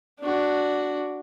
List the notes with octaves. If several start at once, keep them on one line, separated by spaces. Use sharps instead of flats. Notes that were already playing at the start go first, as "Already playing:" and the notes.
D4 F#4